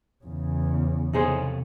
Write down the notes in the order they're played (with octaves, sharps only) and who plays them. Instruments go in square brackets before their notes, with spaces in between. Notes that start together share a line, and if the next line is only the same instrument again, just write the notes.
[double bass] E2 C#3
[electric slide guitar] C3 A4 C#5 [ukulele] D#4 G#4 C5